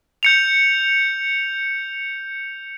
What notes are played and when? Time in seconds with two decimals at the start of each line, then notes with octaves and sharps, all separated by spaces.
0.23 G6 C#7 F7